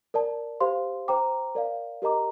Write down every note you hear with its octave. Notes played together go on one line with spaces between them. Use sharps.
A#4 D5 A5
G4 C5 F5 C6
C5 G5 A#5 D6
A#4 D5 F5
G4 A#4 D#5 A#5 D6